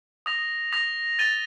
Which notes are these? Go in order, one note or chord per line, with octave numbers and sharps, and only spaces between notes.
D#6 A#6 F7
D#6 A#6 F7
A6 D#7 G7